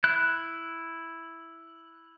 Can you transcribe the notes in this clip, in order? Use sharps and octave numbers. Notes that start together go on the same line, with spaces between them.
E4 F#6